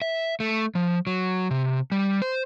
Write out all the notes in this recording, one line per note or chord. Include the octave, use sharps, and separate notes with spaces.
E5
A3
F3
F#3
C3
G3
C5